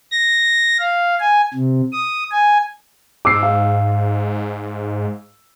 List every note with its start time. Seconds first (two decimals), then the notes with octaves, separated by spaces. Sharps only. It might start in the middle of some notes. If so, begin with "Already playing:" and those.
0.11 A#6
0.79 F5
1.20 G#5
1.54 C3
1.93 D#6
2.31 G#5
3.25 G#2 D6 E6 C7
3.43 F5